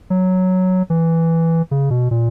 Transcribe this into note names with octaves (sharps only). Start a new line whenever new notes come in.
F#3
E3
C#3
B2
A#2